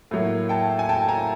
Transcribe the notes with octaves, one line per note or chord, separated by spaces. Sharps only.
A2 F#3 A#3
G5 A5
G#5
G5 A5
G#5 A#5